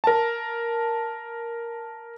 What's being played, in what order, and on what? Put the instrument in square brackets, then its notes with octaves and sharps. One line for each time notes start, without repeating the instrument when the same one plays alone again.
[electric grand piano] A#4 A5